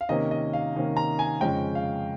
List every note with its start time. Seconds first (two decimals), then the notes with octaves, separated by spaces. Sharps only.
0.01 F5
0.09 C3 D#3 A#3 C#4 D#5
0.31 D#5
0.53 F5
0.75 C3 D#3 A#3 C#4
0.97 A#5
1.19 G#5
1.41 F2 C#3 G#3 C#4 G5
1.75 F5